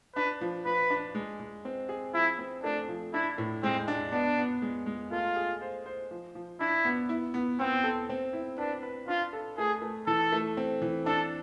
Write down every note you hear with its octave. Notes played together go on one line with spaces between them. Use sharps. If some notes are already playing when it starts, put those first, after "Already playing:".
D4 B4
F3
F3 B4
D4
G#3
G#3
C4
G#4
F3 E4
C4
A3 D4
F3
D4 E4
A2
G#3 C4
D4
B3 D4
B3
G#3
G#3
A3 F4
G#4
C5
C5
F3
F3
D4 E4
B3
E4
B3
B3 C4
A4
C4
E4
D4 B4
B4
D4 F4
A4
A3 G#4
A3
E3 A4
A3
C4
E3
D4 A4